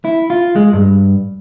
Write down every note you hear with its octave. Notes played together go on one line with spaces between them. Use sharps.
E4
F4
G#3
G2